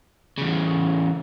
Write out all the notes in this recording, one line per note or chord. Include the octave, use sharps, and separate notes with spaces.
E2 C#3